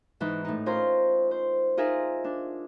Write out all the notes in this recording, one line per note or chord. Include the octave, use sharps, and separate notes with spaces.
G#2 E3 D#4
A2 D#4
C#4 F4 A#4 C5
C5
D#4 F4 G#4 A#4 E5
D4